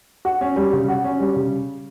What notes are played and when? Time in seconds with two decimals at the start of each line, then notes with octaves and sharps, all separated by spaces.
0.25 F#4
0.41 C#4
0.56 G3
0.73 C#3
0.88 F#4
1.04 C#4
1.20 G3
1.36 C#3